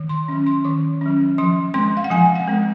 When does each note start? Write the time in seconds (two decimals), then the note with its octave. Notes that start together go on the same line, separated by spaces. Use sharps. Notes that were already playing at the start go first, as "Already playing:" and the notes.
Already playing: D#3
0.09 C6
0.28 F#3 C#4
0.46 C6
0.64 D#3 C#6
1.01 F#3 C#4
1.38 F3 C6
1.74 G#3 C4 C6
1.97 F5
2.04 F#5
2.11 F3 G#5
2.36 F#5
2.47 G#3 C4